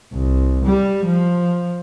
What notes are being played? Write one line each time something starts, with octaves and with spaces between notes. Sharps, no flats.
C2
G3
F3